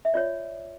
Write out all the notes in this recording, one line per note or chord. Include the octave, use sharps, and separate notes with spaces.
E5
F4 C#5 D5